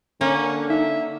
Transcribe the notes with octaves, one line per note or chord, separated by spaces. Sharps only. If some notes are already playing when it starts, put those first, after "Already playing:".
D3 A#3 C#4
D#4 E5